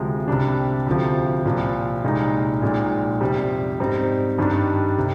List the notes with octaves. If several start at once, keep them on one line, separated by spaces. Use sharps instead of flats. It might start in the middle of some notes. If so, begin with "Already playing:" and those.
Already playing: D2 C3 F3 G#3
C2 C3 G3 D4
D2 C3 F3
C2 A#2 F3
C2 A#2 G#3 D#4
A#1 A#2 G#3 D#4
F2 C3 G3
G#2 G3 C4 D#4
G2 D#3 G3 D4
C3